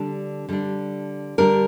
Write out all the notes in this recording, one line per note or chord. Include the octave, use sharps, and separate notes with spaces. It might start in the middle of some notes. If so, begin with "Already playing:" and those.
Already playing: D3 G3 D4
D3 G3 D4
D3 G3 D4 A#4